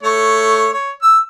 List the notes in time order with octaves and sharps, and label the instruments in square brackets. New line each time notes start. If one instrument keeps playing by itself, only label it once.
[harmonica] A3 C#5
C#5
E6